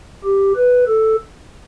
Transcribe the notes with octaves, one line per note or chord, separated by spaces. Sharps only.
G4
B4
A4